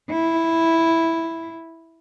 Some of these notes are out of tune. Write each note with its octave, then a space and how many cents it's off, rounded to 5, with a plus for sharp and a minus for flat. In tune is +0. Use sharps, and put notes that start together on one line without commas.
E4 -5